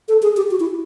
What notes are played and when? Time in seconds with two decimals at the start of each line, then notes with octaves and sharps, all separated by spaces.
0.08 A4
0.22 G#4
0.37 G4
0.51 F#4
0.60 E4